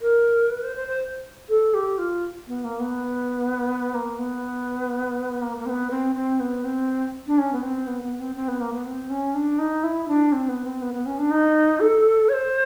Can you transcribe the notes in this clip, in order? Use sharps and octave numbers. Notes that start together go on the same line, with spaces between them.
A#4
B4
C5
C5
C5
A4
G4
F4
B3
A#3
B3
A#3
B3
A#3
A#3
C4
B3
C4
C4
B3
C4
D4
C#4
B3
C4
B3
B3
C4
C4
B3
A#3
B3
C4
C#4
D4
D#4
E4
D4
C4
B3
C4
B3
B3
C#4
D4
D#4
A4
C#5
C5